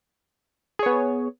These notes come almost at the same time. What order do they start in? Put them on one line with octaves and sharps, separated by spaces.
G#4 C#5 B3